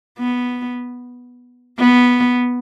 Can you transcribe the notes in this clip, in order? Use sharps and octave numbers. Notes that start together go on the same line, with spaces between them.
B3
B3